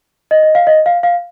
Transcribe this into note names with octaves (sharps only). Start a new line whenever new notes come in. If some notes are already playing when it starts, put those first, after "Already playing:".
D#5
D#5
F5
D#5
F5
F5